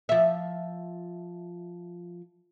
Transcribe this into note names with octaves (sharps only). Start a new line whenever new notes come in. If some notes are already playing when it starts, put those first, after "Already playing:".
F3 E5